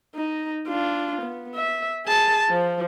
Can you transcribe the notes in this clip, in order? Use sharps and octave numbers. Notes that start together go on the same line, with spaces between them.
D#4
D4 F4
B3
E5
G#4 A5
F3